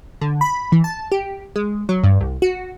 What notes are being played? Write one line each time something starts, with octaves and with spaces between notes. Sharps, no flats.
D3
B5
E3
A5
G4
G#3
F#3
G2
C2
F#4